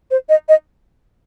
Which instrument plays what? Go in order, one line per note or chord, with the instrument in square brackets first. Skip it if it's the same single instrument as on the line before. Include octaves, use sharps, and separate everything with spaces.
[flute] C5
D#5
D#5